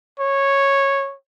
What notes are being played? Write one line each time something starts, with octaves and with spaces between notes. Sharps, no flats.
C#5